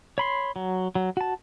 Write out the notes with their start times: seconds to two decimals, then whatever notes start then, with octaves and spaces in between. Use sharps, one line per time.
0.18 C#5 B5 C6
0.56 F#3
0.95 F#3
1.17 F#4 A5